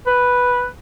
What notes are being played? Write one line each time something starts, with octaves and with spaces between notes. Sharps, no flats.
B4